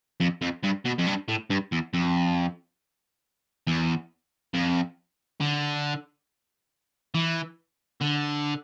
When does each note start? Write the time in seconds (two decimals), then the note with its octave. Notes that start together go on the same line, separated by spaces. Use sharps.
0.20 F2
0.42 F2
0.64 G2
0.86 B2
0.99 F2
1.07 G2
1.29 A2
1.50 G2
1.72 E2
1.94 F2
3.67 E2
4.54 F2
5.41 D3
7.15 E3
8.01 D3